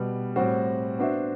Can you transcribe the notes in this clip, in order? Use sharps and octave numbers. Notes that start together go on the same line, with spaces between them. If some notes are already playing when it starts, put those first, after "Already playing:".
Already playing: B2 G3 B3
A2 G3 C4 F#4 C5
B3 D4 F#4 C5 E5